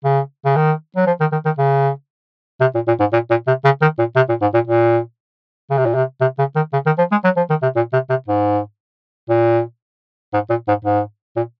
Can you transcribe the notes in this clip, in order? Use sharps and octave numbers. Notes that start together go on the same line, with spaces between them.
C#3
C#3
D#3
F#3
F3
D#3
D#3
D#3
C#3
C3
A#2
A#2
G#2
A#2
A#2
C3
C#3
D#3
A#2
C3
A#2
G#2
A#2
A#2
C#3
C3
A#2
C3
C3
C#3
D#3
C#3
D#3
F3
G#3
F#3
F3
D#3
C3
A#2
C3
C3
G#2
A#2
G#2
A#2
G#2
G#2
A#2